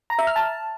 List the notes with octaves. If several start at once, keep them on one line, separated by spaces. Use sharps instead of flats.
A#5
E5
F6
A5